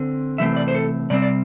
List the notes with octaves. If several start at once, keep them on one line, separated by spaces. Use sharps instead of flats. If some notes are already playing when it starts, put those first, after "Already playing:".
Already playing: D3 C4
C3 E3 A3 C4 E5
D5
C5
A4
C3 G3 C4 D5
D5